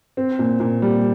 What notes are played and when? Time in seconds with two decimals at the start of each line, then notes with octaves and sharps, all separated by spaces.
0.17 C4
0.39 A#2
0.60 A#2
0.82 G3